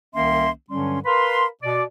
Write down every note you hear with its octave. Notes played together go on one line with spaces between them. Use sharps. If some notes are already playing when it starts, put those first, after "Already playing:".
C2 D#3 A#3 C#4 E5 C6
G2 D3 F#3 G3 C#4 C6
A#4 B4 F5 B5 C6
B2 D5 D6